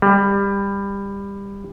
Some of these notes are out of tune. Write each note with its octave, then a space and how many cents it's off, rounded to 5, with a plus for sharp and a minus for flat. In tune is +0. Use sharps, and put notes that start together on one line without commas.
G3 +20